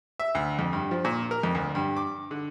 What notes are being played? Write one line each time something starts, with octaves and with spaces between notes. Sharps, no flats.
E5
D2
F2
G2
F3
A#2
A#4
F2
D2
G2
D6
D3